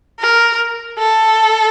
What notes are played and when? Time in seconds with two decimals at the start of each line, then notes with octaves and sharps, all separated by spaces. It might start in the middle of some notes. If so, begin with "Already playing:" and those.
0.19 A#4
0.99 A4